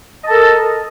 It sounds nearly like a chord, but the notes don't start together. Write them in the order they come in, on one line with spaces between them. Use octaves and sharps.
D#5 A5 A4 A#4